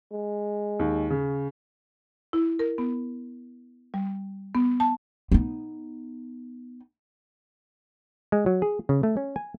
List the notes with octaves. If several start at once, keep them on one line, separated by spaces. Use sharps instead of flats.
G#3
D#2
C#3
E4
A#4
B3
G3
B3
A5
B3 D#4
G#3
F#3
G#4
C#3
A3
C#4
G#5